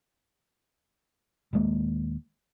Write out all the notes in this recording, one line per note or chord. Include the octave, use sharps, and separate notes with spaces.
D#1 D#2 G#3 A#3